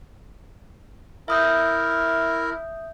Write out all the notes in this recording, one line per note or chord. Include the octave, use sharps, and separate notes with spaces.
E4 A#4 E5 D#6 G6